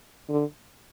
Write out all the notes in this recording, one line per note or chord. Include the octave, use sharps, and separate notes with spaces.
D3